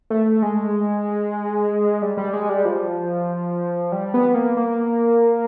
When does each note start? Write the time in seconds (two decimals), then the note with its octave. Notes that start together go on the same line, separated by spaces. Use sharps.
0.10 A3
0.42 G#3
2.02 G3
2.17 G3
2.33 G#3
2.49 G3
2.65 F3
3.92 G3
4.14 B3
4.35 A#3
4.57 A#3